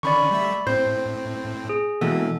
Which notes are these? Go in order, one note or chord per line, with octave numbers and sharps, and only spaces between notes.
D3 D#3 C#4 D5 B5 C#6
G3 A3 E5
A2 C4 C5 G6
G#4
B2 E3 A#3 F#4 A4